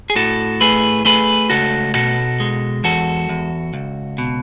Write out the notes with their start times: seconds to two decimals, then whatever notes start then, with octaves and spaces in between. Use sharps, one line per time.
0.10 G#4
0.16 A2 F#4 A4
0.61 A3 G#4 B4
1.05 A3 G#4 B4
1.50 C#2 F#4 A4
1.95 B2 F#4 A4
2.40 G#3
2.84 E2 F#4 A4
3.29 E2
3.74 C#2
4.18 B2